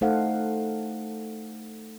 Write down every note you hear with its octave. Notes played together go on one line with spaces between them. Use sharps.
A3 D#4 A4 C5 F5 F#5